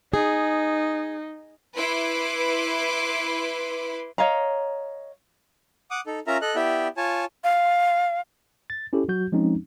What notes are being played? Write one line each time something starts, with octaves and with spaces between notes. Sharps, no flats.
D#4 G#4
E4 B4 C6 D6
C#5 D#5 F5 A#5
F#5 D6 D#6
D#4 A4
C#4 F4 A#4 E5 A#5
A4 D#5 F#6
B3 E4 G4 D5 E5 G5
F4 C#5 G#5 A5
F5
A6
C#4 E4 G4 A4
F#3 F#4 G6
F3 G#3 C4 C#4 D#4